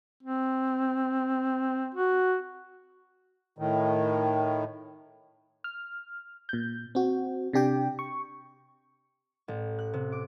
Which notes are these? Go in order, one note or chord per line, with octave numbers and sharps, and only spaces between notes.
C4
F#4
A2 D#3
F6
A#2 G6
C4 F#4
C3 D4 G4 G5
C#6
A1
F#6
C3
D6